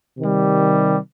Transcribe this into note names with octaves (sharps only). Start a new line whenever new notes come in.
C3 D#3 G3